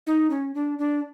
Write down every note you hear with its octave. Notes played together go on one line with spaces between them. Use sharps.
D#4
C#4
D4
D4